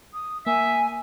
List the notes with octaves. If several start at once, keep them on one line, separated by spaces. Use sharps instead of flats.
D#6
A#3 E5 G#5